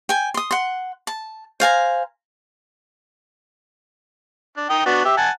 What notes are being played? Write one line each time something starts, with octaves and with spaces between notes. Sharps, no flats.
G5 G#5
C6 D#6
F#5 C6
A5
C5 F5 G#5 A#5
D4
D#4 G5 D#6
B3 D4 F#4
G4 E5
F#5 G#5 A5